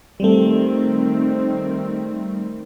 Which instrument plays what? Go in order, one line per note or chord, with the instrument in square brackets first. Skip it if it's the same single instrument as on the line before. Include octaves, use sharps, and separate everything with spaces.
[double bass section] D#3 C4 [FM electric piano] G3 A3